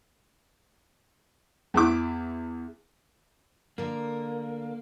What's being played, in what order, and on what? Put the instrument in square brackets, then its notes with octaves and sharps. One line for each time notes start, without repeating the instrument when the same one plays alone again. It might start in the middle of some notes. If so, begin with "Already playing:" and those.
[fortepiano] E2 E4 D6
[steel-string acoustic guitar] D3 A#4 [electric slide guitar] A#3